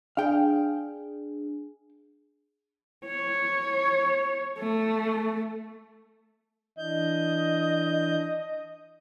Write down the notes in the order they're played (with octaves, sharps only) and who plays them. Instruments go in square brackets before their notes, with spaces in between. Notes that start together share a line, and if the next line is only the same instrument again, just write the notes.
[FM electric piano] D4 G#4 [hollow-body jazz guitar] F5 G5
[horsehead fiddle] C#5
A3
[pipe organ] E3 D4 G6 [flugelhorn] D#5